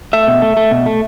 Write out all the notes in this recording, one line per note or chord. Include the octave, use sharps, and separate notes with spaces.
A3 E5
B2
A3
A3
B2
A3